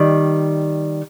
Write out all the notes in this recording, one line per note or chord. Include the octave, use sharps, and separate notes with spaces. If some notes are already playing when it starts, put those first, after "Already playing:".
Already playing: D#3 G3